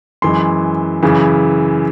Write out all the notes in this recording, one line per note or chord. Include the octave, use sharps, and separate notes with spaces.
F#2 E3 G#3 C6
F#2 C#3 E3